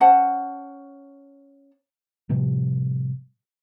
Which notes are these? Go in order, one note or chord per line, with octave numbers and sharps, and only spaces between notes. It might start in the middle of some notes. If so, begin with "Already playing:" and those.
C#4 C5 F#5 A5
A2 C3 F3 G3